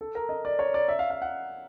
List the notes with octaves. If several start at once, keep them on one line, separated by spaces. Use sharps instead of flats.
A4
A#4
D#5
D5
C#5
D5
E5
F5
F5
F#5